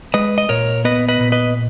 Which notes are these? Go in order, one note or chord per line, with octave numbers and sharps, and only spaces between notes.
G#3 B4 D#5
D#5
A#2 A#4 C#5
B3 B4 D#5
B4 D#5
A#2
B4 D#5